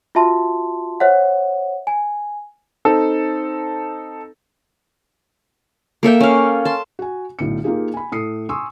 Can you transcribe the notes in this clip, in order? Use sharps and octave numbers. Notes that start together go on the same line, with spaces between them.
F4 F#4 E5 A5 C6
C5 C#5 E5 F#5
G#5
C4 D#4 A4
A#3 A4 E5 G5
C#4 F5
A5 C6
F#4 G#5
B1 A2 D3 C#7
A#3 D#4 F4 G4 G#4
G#5 B5
A2 A4 D#6 C7 C#7
G#5 C6 C#6 D#6 E6